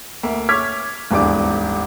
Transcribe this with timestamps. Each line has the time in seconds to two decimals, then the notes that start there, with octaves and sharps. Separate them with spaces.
0.23 D2 A#3 E5
0.49 C#5 D6 F6 G#6 B6
1.11 D#1 G#1 E2 A3 D4 D6